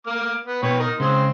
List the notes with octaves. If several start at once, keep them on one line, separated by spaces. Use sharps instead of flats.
A#3 D6 F6
B3
B2 B4 C#5 G5
D#4 A#4
C#3 G#3 C4 C6